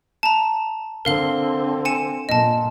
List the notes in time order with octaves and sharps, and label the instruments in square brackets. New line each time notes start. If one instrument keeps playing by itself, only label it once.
[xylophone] A5 A#5
[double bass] D3 C4 [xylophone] A#4 F5 G7
[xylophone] G#5 C#7 E7
[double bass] A#2 [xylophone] D#5 A5